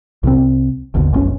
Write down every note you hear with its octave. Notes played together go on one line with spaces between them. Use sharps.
C2 C3 F3 C4
G#1 D#2 B2 D3
F#1 B1 C4 C#4